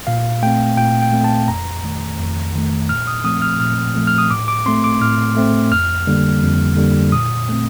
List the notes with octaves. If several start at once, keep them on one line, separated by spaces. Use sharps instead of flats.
A#2 F5
A3 C4 G5
A#2 G5
G5
A3 C4
A5
F2 A#5
D#3 A3
F2
D#3 A3
A#2 F6
D#6
F3 A3 C4 D#6
F6
A#2 F6
F3 A3 C4
F6
D#6
A2 D6
D6
A3 C4 C6
D6
A2 F6
A3 C4
F2 F6
D3 G3 A#3
F2
D3 G3 A#3
A#2 D#6
A3 C4